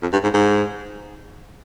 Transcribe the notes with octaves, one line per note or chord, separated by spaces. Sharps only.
F2
G2
G#2
G#2